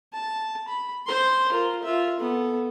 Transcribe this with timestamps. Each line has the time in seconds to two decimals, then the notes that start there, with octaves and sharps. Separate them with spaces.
0.13 A5
0.68 B5
1.07 C5 C6
1.52 F4 A#4
1.83 F4 E5
2.20 B3 A4